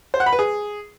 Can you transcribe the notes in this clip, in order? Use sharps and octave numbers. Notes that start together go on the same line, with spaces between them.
C5
F#5
B5
B4
G#4